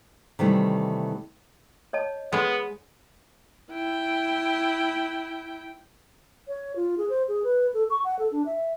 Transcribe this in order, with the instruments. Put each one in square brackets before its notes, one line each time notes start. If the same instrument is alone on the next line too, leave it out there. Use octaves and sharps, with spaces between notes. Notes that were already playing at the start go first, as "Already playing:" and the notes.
[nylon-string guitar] C3 D#3 E3 G3 A3
[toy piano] C#5 D#5 A5
[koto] G#3 G#4 [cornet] B3
[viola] E4 G5
[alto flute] C#5
F4
G#4
C5
G#4
B4
A4
C#6
F#5
A4
D4
E5